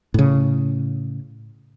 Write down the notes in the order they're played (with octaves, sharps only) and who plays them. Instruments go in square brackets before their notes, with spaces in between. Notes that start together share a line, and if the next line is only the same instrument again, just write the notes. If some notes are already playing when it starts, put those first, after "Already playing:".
[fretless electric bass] A2 C#3